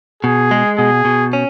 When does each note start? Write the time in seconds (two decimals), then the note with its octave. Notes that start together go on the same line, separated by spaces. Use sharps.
0.23 B2 G#4
0.51 G#3
0.78 B2 G#4
1.05 B2
1.33 C#4